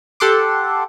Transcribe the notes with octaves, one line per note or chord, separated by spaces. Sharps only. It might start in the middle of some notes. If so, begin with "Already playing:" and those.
G4 A4 F#5 C6 D6